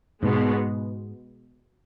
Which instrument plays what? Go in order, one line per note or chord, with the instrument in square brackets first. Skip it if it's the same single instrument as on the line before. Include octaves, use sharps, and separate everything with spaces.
[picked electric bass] G#2 [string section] B2 G#3 B3